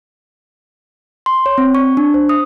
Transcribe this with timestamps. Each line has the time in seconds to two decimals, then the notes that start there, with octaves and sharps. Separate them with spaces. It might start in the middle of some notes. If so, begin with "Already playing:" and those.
1.26 C6
1.46 C#5
1.58 C4
1.75 C#6
1.97 D4
2.14 C5
2.29 D#6